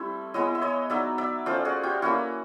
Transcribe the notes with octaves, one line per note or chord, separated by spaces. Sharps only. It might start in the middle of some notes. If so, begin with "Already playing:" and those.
Already playing: G3 A3 C4 E4
G#3 B3 E4 C#5 D#5
E5
C#5 D#5
F#3 B3 D#4 D5 E5
D5 E5
A3 C#4 F4 C5 D5
F#4 G#4
F4 G4
A#3 C#4 E4 F#4